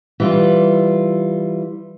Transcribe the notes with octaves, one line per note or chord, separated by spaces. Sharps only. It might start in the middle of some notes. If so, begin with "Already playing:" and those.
E3 G3 F4